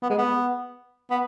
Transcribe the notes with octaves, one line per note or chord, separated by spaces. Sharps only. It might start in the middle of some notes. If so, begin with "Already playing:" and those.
B3
G#3
B3
B3